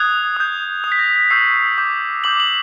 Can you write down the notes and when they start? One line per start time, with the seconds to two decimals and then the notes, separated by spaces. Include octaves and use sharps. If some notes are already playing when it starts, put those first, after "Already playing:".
Already playing: D#6 F#6 G#6
0.37 D#6 G6
0.84 D#6 G6
0.92 B6
0.99 A#6
1.15 B6
1.30 C#6 E6 G6 C7
1.78 D6 G6
2.24 D6 G6 F#7
2.40 F#7